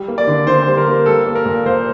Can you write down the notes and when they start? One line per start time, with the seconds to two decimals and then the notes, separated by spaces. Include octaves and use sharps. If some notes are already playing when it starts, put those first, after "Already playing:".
Already playing: G3
0.08 A#3
0.18 D5
0.27 D3
0.47 D3 C5
0.63 C5
0.68 G3
0.77 A#4
0.87 A#3
1.06 G3 A4
1.26 A#3
1.35 A#4
1.46 A#2
1.66 A#2 C5